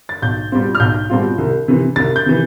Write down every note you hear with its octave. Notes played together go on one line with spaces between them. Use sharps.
A6
B1 G6
B2 G3 C4 F4
F6
B1 G6
B2 G3 C4 F4
C2
C3 E3
C2 A6
G6
C3 E3